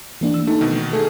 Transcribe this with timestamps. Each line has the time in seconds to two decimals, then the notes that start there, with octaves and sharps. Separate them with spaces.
0.21 E3 A#3 D4
0.34 E6
0.47 A3 D#4
0.61 B2 D#3
0.93 A3 G#4 A4